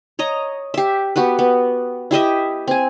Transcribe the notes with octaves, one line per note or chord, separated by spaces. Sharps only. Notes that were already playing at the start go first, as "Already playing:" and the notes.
C#5 D#5 A#5
G4 E5
B3 F#4 G4 B4
B3
E4 G4 D#5 E5
C4 G#5